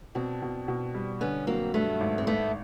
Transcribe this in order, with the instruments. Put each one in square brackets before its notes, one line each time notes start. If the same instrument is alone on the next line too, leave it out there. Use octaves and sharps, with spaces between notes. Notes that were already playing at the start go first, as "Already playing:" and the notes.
[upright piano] B2 [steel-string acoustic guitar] C4 D4
[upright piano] B2
B2
G3
[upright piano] D3 [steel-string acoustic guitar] B3 C#4
[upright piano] F#3 [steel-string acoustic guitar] A#3 C4
[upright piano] G2 [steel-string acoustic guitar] A3 B3
[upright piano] G#1
[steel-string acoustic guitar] C4
[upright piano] G#1 [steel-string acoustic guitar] A3 B3